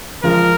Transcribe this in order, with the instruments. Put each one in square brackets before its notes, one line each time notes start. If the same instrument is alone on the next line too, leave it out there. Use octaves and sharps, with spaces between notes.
[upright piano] F3 G#3 [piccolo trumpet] A#4